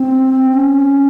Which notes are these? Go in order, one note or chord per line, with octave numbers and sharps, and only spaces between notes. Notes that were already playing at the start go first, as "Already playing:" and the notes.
Already playing: C4
C#4